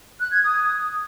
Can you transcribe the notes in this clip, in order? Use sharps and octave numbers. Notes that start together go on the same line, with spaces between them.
F#6
G#6
D#6